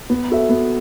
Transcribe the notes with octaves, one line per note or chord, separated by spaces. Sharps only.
B3
F#4 A4 E5
B3